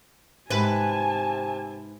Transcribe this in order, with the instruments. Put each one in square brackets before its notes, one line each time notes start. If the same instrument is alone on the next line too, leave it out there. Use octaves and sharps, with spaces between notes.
[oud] G#2 B4 [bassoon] C3 [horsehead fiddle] G#5 A5